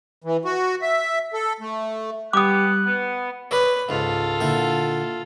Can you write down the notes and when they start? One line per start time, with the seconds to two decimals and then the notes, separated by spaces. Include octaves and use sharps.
0.24 E3
0.45 F#4
0.82 E5
1.34 A4
1.60 A3
2.33 G3 B3 G4 D6 D#6 F#6
2.86 B3
3.51 B4 C#5 D5 D#6
3.89 C#2 G#2 F4 A4
4.40 A#2 D3 E4